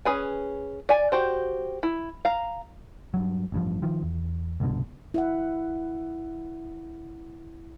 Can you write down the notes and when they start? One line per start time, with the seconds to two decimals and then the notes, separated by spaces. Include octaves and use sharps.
0.05 C#4 G#4 B4 G#5
0.89 D5 G#5
1.12 F#4 G4 C5
1.83 E4
2.25 F5 A#5
3.14 G2 F#3
3.52 A1 G2 F3
3.82 D#3 F3
4.02 E2
4.60 C2 G2 B2 D3
5.14 E4 E5 F#5